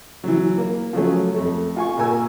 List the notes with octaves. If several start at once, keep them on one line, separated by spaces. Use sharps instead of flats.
E3 F#3
A#3
F3 F#3 A3 C#4
F2 A3
F4 G#5 C#6
A#2 A#4 G#5 E6